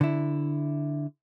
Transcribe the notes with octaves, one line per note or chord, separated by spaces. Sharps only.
D3 E4